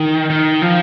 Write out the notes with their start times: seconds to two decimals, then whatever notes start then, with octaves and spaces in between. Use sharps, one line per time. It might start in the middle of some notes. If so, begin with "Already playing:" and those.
Already playing: D#3
0.30 D#3
0.62 F3